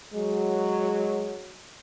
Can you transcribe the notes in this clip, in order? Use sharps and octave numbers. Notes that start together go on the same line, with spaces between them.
F#3 G#3